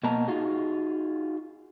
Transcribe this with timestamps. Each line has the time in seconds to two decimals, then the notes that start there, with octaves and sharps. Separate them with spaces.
0.03 B2 A#3 D#5 A5 A#5
0.27 D#4 F4 F#4 G#4